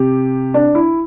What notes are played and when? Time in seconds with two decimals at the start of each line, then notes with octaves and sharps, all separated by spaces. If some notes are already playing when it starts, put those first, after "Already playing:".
Already playing: C3 G4
0.54 D4
0.75 E4